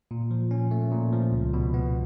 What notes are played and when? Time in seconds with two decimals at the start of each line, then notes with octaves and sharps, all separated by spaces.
0.11 A#2
0.31 F3
0.51 C#4
0.71 A3
0.92 A#2
1.12 F3
1.33 C#2
1.54 B2
1.74 B3